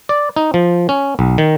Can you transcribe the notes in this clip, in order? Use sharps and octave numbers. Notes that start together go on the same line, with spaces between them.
D5
D#4
F3
C#4
B1
D#3